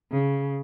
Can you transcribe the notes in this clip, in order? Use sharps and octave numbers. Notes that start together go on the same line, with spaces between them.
C#3